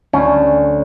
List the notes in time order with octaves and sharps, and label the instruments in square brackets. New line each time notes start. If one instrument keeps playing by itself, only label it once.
[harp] D2 [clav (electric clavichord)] C#4